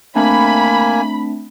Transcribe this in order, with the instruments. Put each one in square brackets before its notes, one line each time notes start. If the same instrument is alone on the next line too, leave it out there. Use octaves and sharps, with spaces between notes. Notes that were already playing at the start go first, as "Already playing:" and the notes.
[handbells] A3 C4 D4 [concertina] A#3 G#5 [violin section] B5